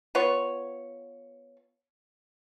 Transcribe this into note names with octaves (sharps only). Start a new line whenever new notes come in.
B3 F4 B4 C#5